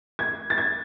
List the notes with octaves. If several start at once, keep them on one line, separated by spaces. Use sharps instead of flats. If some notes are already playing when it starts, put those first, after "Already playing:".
G#6
A6
G#6